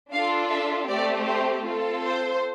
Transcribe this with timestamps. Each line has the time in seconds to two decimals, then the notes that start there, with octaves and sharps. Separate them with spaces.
0.13 D4 F4 A4 F5
0.50 E5
0.88 A3 C4 G4 D5
1.26 C5
1.65 C4 F4 A4
2.02 C5